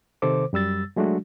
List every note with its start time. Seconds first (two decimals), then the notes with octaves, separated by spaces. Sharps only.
0.22 C3 D#3 A4 C5 D6
0.53 F#2 G3 E6 A6
0.96 F#3 G#3 A3 D4 F#4